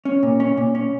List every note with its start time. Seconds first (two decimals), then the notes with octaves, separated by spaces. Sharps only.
0.05 C#4
0.23 A#2
0.40 C#4
0.57 A#2
0.75 C#4